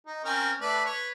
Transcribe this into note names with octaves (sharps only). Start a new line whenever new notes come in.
D#4
C4 C#4 A#4
A3 B4 D5
B4 C#5